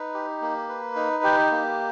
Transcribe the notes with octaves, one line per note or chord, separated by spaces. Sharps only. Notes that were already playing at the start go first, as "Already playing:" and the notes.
Already playing: D#4 B4
G4
A#3
B4
D#4
G4
A#3